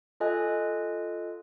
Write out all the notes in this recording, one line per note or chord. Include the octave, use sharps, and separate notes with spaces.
F4 A4 D#5 G#5 F#6